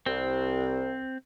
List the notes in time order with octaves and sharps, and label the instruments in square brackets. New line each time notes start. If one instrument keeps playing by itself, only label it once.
[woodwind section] C2 [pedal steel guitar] C4